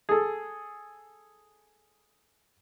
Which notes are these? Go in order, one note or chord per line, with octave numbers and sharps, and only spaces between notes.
G#4 A4